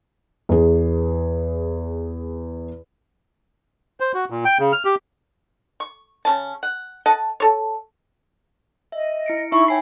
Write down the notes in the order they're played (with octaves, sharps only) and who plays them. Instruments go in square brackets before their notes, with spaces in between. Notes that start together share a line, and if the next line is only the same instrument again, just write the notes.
[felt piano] E2 G#4
[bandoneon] C5
F#4
A#2
G5
C#3
F6
G4
[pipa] C#6
C#3 C#4 A5
F#5
A4 D#5 F#5 A5
A4 C#5
[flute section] D#5 [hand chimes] E5
[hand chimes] E4 C#7 D7
[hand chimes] D#4 E5 B5 [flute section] E4 C#6
[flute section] C#5 [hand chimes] G5 G#5 C7